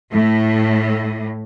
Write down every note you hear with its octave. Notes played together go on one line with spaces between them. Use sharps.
A2